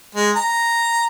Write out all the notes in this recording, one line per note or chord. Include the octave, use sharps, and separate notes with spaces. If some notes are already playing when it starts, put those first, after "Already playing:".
G#3
A#5